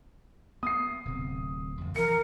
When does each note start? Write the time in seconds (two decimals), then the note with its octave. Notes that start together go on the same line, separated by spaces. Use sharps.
0.63 B3 D#6 C7
1.05 D1 C3
1.77 G1 F2
1.96 E3 F3 A#4 C#7